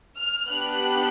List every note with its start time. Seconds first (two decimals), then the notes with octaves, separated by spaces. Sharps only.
0.17 F6
0.50 B3 D4 G4 F#6